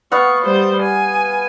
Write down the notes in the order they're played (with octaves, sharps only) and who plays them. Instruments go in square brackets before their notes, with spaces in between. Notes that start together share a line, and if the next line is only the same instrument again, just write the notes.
[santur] B3 F5 F#5 [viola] C#6
[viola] G3 C5
G#5